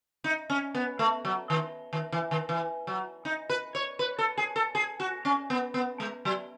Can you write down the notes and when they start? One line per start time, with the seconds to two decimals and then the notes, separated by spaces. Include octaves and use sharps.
0.24 D#4
0.50 C#4
0.75 B3
0.99 A3
1.25 F#3
1.50 D#3
1.93 D#3
2.12 E3
2.31 D#3
2.49 E3
2.87 F#3
3.25 D#4
3.50 B4
3.75 C#5
3.99 B4
4.18 A4
4.37 G#4
4.56 A4
4.75 G#4
5.00 F#4
5.25 C#4
5.50 B3
5.74 B3
6.00 G#3
6.25 F#3